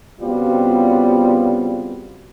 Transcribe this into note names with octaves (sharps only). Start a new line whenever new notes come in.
C#3 G3 B3 C4 F4 F#4